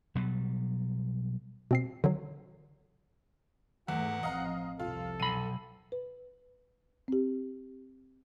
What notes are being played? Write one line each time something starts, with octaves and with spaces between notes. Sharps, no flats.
B2 F#3 G3
B2 C4 C7
D3 D#3 F#3
E2 G#2 A3 F#5
A1 F3 C4 D#5 F5 A#5
C2 F2 F3 F4 A4
B1 B5 D#7
B4
C4 G4